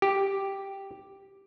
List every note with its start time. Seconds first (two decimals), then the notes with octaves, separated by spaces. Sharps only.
0.02 G4